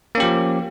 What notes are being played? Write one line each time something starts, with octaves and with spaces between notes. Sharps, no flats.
F3 A#3 C#4 G4